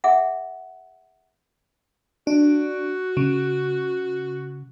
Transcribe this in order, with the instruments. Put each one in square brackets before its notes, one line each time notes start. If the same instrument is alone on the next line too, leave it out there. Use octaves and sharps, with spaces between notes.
[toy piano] G#4 E5 F#5
[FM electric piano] D4 [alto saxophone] F#4
[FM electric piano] C#3